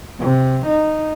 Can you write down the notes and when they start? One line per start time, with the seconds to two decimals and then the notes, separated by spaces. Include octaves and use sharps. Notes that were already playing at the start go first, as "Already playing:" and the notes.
0.19 C3
0.67 D#4